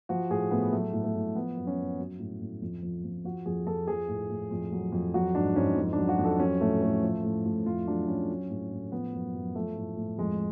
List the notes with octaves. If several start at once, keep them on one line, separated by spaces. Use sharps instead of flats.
F3 F#4
A2 G#4
A2 B3
F#3 A3
A2
A3
A2
F3 B3
F#2
C#4
F#2
F#3
A2
A2
F2
F3
F2
F3 F#4
F2 G#4
F2 A4
F3 G#4
A2
A2
F2
F#3
F2
F#3 F#4
G#2 D4
G#2 C#4
F2
D4
F#3
F#4
F2
A4
F#3 C#4
A2 A3
A2 A3
F3
A2
A2
F2 F4
F#3 D4
F2 C#4
F#3
A2
A2
F3 B3
F#2
F#2
F3 A3
A2
A2
F2 G#3